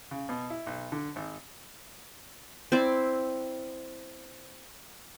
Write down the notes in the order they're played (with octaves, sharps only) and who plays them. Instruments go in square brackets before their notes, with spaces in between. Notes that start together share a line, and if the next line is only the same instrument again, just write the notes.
[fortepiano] C#3
B2
E4
B1
D3
G#1
[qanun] C4 E4 C5 D5